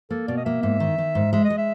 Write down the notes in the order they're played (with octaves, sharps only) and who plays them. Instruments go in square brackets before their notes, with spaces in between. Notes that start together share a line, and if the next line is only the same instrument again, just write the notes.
[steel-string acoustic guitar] A#3 [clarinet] A4
[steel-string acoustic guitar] B2 [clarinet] D5
[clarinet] D#5
[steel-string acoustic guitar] A#3 [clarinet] E5
[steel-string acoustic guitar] G#2 [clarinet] E5
[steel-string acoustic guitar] D#3
D#3
G#2
[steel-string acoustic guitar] G#3 [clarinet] E5
[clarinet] D#5
[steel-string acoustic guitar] G#3
[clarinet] E5